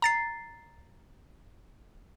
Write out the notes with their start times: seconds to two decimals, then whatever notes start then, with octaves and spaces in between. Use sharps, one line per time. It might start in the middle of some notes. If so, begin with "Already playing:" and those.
0.02 A#5 A6 C7